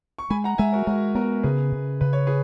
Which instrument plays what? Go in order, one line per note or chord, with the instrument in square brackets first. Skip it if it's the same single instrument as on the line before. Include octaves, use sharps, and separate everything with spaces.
[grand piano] C#6
[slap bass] G#3 [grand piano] G#5 B5
[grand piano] F#5 A#5
[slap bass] G#3 [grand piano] E5 G#5
[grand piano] F#4 A#4
[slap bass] G#3 [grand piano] F#4 A#4
[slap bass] B3 [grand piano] F#4 A#4
[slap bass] C#3 [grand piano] G#4 B4
[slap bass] C#3
[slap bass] C#3 [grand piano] B4
[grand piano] C#5
G#4 B4